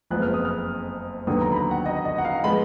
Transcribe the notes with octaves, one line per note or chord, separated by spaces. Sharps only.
F#1 F2 F3 G#3 B3 F#6
F6
D#6
F6
D#2 D3 F#3 B3 D#6
A#5
B5
A#5
F#5
D#5
D#5
F#5
F5
F3 G#3 B3 B5